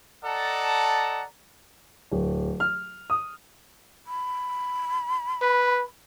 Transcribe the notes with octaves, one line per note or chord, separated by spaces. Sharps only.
A4 D5 D#5 F#5 A5 A#5
D1
F6
D#6
B5
B4